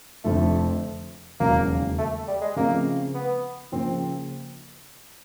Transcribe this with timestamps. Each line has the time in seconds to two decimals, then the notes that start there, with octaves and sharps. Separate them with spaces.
0.24 F1 F2 D3 A3
1.40 E1 D#2 C#3 F#3 A#3
1.99 A3
2.28 G3
2.41 G#3
2.56 C#3 F3 A3 A#3 C4
3.15 B3
3.72 C#3 F3 A#3 C4